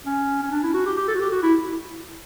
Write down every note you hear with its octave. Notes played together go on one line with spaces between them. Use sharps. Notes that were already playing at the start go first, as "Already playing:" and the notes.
C#4
C#4
D4
E4
F#4
G4
G4
A4
F#4
G4
F#4
E4